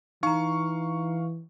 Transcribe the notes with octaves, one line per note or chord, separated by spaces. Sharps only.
E3 D#4 F5 A#5 C#6